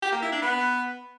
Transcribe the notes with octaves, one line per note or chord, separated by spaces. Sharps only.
G4
A#3
E4
D4
B3